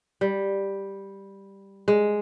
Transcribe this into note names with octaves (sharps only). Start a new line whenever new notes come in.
G3
G#3